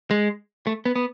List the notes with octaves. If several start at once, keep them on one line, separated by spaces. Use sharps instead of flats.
G#3
A3
B3
B3